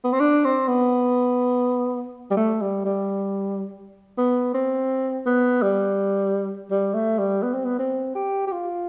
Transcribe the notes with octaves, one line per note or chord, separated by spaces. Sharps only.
B3
C4
D4
C4
B3
G3
A3
G3
G3
B3
C4
B3
G3
G3
A3
G3
B3
C4
B3
C4
G4
G4
F4